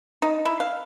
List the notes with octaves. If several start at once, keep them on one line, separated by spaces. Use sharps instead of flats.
D#4
E4
F5